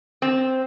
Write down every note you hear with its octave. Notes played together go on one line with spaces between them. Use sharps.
C4